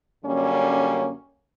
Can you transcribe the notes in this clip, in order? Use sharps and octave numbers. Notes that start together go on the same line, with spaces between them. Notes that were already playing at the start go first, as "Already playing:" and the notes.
F#2 D3 G3 A#3 C#4